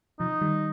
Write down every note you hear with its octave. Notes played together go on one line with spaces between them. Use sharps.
C3 F3 D#4
D#3 G3